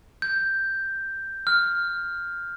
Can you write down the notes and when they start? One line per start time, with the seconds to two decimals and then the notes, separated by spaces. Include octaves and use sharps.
0.22 G6
1.47 F6